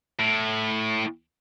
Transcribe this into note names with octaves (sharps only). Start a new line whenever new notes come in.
A2